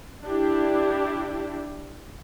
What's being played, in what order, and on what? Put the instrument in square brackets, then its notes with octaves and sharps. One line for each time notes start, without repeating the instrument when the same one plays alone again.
[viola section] D4 E4 G4